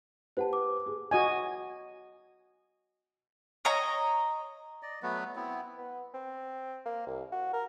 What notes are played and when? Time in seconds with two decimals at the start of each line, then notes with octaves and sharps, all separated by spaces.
0.37 G4 B4 C5 F#5 A5
0.53 D6
0.86 G#4
1.11 F#4 D#5 G#5
3.65 C#5 D#5 A#5
4.82 D5 D#5
5.03 F#3 A3 B3 B4
5.36 B3 C4 E4
5.78 B3
6.14 C4
6.86 A#3
7.07 C2
7.32 F#4
7.53 A#4